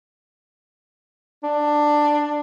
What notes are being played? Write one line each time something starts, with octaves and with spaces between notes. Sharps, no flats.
D4